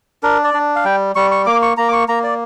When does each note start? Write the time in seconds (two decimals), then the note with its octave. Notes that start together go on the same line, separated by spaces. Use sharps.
0.23 D4 A#4
0.44 D5
0.54 D4
0.76 F5
0.84 G3 G5
1.16 G3 C#6
1.31 C#6
1.46 A#3 D6
1.62 C#6
1.77 A#3 A#5
1.89 D6
1.93 C#6
2.08 A#3 A#5
2.24 D5